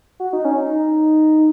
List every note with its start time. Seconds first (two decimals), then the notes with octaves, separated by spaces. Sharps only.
0.20 F#4
0.33 D#4
0.45 C#4
0.57 D#4